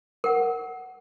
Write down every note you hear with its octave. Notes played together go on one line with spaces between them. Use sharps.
A#4 F#5